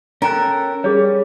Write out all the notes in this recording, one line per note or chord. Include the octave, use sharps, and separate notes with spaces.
C#4 A4 A#4 G5 F#6
G3 C#4 G#4 C#5